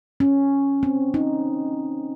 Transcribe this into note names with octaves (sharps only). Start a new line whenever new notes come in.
C#4
C4
D#4